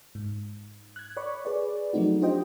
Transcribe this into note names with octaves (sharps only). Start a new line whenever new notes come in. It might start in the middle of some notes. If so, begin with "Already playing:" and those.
G#2
F#6 G#6
C#5 D5 B5 C#6
G#4 B4 D5
F3 F#3 A3 C4 D#4 F#4
D4 F4 G4 C5 D#5 G5